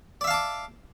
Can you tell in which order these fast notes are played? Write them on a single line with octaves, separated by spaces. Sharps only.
D5 E5 F5 A5 D6